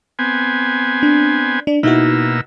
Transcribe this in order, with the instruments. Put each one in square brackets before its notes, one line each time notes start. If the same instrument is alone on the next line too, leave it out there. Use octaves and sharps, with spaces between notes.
[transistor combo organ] B3 C4 G#5
[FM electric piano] D4
D4
[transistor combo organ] B2 A#3 E6 [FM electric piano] D#4 E4 F#4